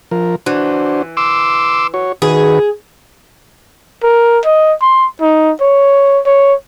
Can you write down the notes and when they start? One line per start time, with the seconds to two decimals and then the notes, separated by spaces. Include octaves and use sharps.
0.11 F3 A#4
0.46 E3 D4 F#4 C5
1.17 C6 D6 E6
1.94 F#4 C#5
2.22 D#3 F#4 G#4 B4
4.03 A#4
4.46 D#5
4.82 C6
5.22 D#4
5.61 C#5
6.26 C#5